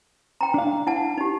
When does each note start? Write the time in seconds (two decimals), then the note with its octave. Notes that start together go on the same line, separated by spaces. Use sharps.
0.41 G5 A#5
0.54 D4 F5
0.87 E4 F#5 A5
1.18 D#4 G4